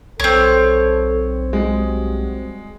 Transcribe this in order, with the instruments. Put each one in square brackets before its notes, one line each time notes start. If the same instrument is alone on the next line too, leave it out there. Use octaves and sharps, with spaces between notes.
[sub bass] B1 [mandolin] C4 C#5 [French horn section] A4
[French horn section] G3 F#4 [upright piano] G#3